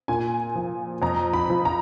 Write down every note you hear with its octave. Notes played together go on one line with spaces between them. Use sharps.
A#2 G#5
F3
F2 A#5
B5
F3
A#5